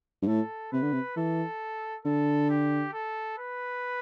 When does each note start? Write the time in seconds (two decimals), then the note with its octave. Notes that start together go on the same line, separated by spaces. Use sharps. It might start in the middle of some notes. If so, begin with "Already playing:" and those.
0.22 G2
0.27 A2 A4
0.72 C3 B4
0.82 D3
0.93 C3
1.16 E3 A4
2.05 D3 A4
2.50 G4
2.93 A4
3.38 B4